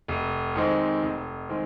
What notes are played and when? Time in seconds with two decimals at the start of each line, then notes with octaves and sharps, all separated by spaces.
0.08 F1
0.55 F2 D#3 G#3 C4
1.02 F1
1.49 D#3 G#3 C4